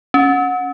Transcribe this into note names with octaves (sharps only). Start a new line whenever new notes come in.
C#4